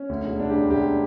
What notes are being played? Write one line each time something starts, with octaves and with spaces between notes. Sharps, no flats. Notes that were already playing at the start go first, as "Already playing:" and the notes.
Already playing: C#4
D2
E1
D3 D4
G4
E1
D2 G4